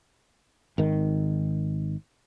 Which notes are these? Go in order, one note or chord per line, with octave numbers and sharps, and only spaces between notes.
G#1 D#3